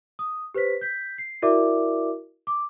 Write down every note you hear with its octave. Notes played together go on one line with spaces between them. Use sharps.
D#6
G4 B4 C5 B6
G6 B6
C7
E4 F#4 A#4 D5 E5 D6
D6